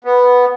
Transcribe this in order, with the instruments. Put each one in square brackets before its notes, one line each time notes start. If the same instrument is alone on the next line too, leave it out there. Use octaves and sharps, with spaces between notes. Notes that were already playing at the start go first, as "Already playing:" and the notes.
[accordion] B3